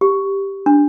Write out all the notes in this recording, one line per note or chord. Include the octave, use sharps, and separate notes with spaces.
G4
D4